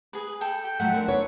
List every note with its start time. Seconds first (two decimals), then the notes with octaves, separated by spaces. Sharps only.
0.13 G#4 B4
0.41 A4 G5
0.64 G5
0.80 F3 F#3 A3 F#5
0.94 C4 D4 A#4
1.09 B3 C#5